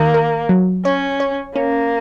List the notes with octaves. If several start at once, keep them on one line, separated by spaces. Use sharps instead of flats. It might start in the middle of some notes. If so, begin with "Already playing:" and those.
Already playing: D#3 A#3
A#4
F#3
C#4 C#5
C#5
A#3 C#4